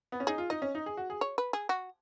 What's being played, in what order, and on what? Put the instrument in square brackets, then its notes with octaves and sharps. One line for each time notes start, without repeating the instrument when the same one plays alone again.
[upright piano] B3
C#4
[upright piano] D#4 [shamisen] G#4
[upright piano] F4
[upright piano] D#4 [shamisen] D#5
[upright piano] C#4
D#4
G#4
F#4
G#4
[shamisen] C#5
B4
G#4
F#4